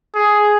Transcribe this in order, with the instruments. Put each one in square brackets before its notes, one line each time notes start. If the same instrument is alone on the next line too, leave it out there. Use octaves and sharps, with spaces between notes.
[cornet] G#4